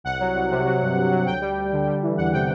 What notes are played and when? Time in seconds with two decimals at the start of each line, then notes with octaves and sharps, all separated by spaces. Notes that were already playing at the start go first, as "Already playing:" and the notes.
0.04 C2 F#5
0.20 F#3
0.35 C2
0.50 C3
0.65 F#3
0.81 G2
0.95 G2
1.11 F#3
1.26 D2 G5
1.41 G3 G5
1.57 D2
1.72 D3
1.87 G3
2.02 E3
2.17 E2 F#5
2.33 C3 G5